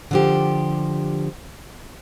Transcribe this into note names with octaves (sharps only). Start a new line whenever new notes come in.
D3 F3 G4